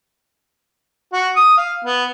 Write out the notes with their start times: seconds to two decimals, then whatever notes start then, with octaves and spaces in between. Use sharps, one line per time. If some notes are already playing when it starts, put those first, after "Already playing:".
1.12 F#4
1.35 D#6
1.57 F5
1.85 B3